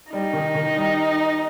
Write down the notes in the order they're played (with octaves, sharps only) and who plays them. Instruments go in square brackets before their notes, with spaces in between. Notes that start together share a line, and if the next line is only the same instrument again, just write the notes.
[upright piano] G3 [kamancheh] D#4
[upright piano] D#3
D#3
G3